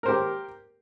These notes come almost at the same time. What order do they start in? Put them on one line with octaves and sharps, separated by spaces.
A#4 C5 G4